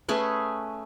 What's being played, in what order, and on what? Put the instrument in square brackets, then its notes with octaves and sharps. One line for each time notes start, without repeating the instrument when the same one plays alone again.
[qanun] A3 C#4 G#4 B4